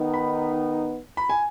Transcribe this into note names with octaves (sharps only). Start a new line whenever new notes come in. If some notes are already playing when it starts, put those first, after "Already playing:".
Already playing: D#3 B3 D#4
B5
B5
G#5